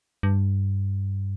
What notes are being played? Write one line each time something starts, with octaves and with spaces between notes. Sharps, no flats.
G2